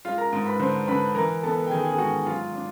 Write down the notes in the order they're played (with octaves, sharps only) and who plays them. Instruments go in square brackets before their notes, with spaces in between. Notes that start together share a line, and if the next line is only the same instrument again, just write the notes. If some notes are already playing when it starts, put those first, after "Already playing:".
[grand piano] G#3 [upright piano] F4 F5
[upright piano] A#4 A#5
[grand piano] G#2
[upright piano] B4 B5
[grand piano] D3 [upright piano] C5 C6
[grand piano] D3 [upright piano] B4 B5
[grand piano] E3 [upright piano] A#4 A#5
[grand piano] B3 [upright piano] A4 A5
[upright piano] G5
[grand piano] D#3 [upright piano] G#4 G#5
[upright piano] G#4 G#5
[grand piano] G#2 [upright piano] F#4 F#5
[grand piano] F#3 [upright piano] F4 F5
[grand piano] D4